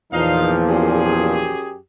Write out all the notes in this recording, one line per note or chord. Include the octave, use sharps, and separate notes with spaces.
E2 A#2 F3 D#4 F5
F#2 G4 G#4